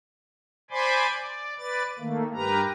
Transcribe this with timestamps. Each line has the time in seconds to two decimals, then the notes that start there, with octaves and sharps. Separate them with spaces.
0.71 C5 D5 G#5 B5 C6 D6
1.15 D5
1.58 B4 D5 A6
1.99 D#3 A3 A#3
2.34 G2 G4 A#4 B4 A#5